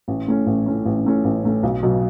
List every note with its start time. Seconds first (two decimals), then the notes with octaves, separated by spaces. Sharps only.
0.08 A1
0.28 A2 A3 C#4
0.47 A1
0.66 A2 A3 C#4
0.85 A1
1.06 A2 A3 C#4
1.24 A1
1.44 A2 A3 C#4
1.63 B1
1.83 B2 F#3